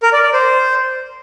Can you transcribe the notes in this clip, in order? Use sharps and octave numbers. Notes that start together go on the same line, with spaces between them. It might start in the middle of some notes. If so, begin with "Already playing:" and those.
A#4
D5
D5
C5